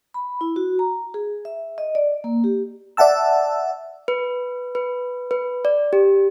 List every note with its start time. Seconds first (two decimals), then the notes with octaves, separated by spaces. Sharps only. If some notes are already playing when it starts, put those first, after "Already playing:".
0.14 B5
0.41 E4
0.56 F#4
0.79 A#5
1.14 G#4
1.45 E5
1.78 D#5
1.95 D5
2.24 A#3
2.44 G4
2.97 D5 E5 F#5 A5 E6
4.08 B4
4.75 B4
5.31 B4
5.65 D5
5.93 G4